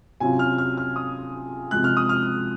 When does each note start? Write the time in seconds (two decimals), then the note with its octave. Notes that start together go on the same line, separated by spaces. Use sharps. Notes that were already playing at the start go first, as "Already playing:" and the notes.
0.20 C3 F#3 C#4 F4 G#5
0.39 F6
0.58 F6
0.77 F6
0.96 D#6
1.71 C3 F3 G#3 F#6
1.84 F6
1.97 D#6
2.09 F6